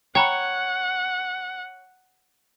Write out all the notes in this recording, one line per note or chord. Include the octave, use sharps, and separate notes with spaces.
C#5 F#5 G5 A#5 B5